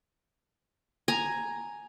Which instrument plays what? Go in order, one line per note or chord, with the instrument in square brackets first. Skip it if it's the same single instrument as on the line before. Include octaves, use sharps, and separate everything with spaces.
[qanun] G#5 A#5